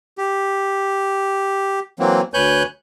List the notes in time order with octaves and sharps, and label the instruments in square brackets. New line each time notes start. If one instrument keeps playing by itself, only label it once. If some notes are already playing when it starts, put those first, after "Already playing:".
[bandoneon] G4
E3 F#3 A#3 C4
D2 B4 C#5 G#5 F#6 G6